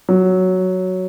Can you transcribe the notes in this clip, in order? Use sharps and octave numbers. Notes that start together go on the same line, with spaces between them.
F#3